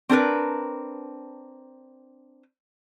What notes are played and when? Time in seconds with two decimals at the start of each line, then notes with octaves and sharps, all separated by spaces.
0.09 C4 D4 A#4 B4